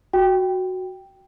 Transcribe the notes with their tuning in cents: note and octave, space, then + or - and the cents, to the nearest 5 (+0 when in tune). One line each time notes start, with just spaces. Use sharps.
F#4 +0 G5 +0